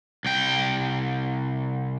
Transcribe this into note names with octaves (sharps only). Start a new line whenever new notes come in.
C2 G5